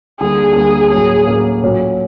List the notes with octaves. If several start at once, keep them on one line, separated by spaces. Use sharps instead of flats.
D2 D3 G3 A#3 G#4
D2 D3 G3 A#3 G#4
A2 F#3 A#3 C#4 G#4
A2 F#3 A#3 C#4
A#2 F#3 A3 C#4 F#4